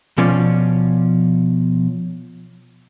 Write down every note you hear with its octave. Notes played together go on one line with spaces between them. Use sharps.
B2 F3 C#4 C#5 D5